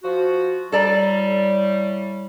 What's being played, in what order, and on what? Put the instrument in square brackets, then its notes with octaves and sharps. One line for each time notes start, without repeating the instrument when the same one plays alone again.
[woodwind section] F3 F#4
[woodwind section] A2 G3 [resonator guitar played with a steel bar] A4 D5 A#5